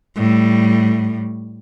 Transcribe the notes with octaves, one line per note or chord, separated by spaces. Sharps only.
A2 G3